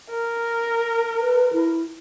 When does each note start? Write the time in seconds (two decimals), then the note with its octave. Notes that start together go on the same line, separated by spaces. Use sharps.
0.10 A#4
1.20 B4
1.53 E4